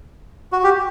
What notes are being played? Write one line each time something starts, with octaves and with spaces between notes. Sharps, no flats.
F#4
G4